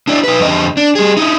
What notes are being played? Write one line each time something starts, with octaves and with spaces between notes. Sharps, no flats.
D4 E4 D5
D#4 B4
F2 D3 D#5
D4
G3 G#4
D#4 E4